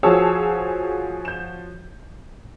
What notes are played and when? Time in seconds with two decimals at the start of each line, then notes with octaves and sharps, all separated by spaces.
0.03 F3 F#4 G#4 C#5 A5 E6
1.25 G6 E7